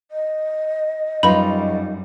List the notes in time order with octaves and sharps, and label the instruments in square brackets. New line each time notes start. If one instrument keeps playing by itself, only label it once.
[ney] D#5
[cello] F#2 G3 [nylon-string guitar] D#4 F4 [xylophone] B4 B5